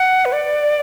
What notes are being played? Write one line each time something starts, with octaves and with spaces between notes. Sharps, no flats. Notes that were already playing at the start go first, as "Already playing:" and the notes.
Already playing: F#5
B4
D5